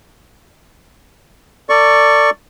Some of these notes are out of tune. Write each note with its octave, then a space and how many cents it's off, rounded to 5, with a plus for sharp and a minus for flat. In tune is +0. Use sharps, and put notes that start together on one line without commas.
A4 +40 D5 +0 C#6 +0